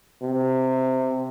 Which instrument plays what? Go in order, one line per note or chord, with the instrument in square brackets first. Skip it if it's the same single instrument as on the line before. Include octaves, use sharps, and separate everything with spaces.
[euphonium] C3